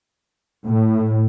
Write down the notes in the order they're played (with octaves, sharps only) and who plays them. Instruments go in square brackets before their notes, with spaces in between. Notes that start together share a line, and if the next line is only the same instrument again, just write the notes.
[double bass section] A2